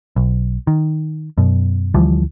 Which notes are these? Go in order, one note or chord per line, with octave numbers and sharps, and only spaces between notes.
B1
D#3
F#2 B2
D2 E3 F3 G3